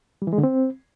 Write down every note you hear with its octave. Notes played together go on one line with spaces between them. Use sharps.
G3
E3
G#3
D3
C4